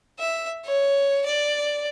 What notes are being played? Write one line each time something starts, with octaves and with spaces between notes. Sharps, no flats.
E5
C#5
D5